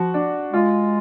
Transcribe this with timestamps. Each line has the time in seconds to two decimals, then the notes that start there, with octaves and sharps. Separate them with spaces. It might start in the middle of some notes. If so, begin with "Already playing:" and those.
Already playing: F3 F#4
0.14 D4
0.53 G#3 F4